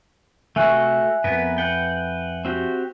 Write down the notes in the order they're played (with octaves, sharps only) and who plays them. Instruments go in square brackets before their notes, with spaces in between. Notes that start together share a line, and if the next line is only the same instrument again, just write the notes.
[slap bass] C3 [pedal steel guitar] A3 F#4 [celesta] E5 G#5 F#6
[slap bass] F2 [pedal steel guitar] B3 A#4 B4
[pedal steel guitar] B4 F#5 G5
C4 F#4 G4